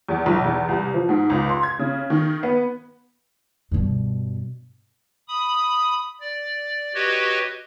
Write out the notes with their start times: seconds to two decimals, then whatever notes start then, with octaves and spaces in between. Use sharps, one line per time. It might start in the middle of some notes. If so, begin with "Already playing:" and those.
0.09 E2
0.26 B1
0.44 E2
0.69 C2
0.94 F3
1.09 G#2
1.30 C#2
1.49 C6
1.63 G#6
1.79 C#3
2.10 D#3
2.43 B3
3.71 G2 B2
5.28 B5 D#6
6.20 D5
6.95 F#4 G4 B4 C#5 D#5